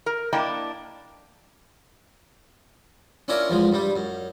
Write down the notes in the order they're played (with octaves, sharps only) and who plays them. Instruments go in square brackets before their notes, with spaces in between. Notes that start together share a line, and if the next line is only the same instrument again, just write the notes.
[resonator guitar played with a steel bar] A#4
A#3 D4 E4 D#5 G5
[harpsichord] C#4 D4 E4 F4 A#4 C#5
E2 F3 G#3
G2 G3
F#2